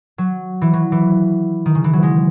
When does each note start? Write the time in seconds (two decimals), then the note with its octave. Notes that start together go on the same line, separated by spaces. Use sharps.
0.18 F#3
0.62 E3
0.74 F#3
0.92 E3
1.66 D#3
1.75 C#3
1.84 E3
1.93 F#3
2.03 G#3